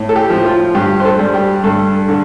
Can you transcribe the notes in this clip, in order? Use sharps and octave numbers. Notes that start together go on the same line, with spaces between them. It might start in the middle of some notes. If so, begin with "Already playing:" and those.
Already playing: A2
A4
G4
F3
F4
G2 G4
C5
A4
G3
G4
G2 A4
D3